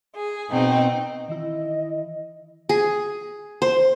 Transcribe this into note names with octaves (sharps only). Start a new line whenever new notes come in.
G#4
B2 C4 D#4
D#3 E3 E4 D#5
G#4
C5